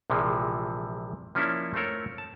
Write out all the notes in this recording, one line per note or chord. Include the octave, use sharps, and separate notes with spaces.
A#1 C3 E3 F3 G#3
F3 A#3 C#4 D4 E4
A3 C4 F4 A4 A#4 C#5
A5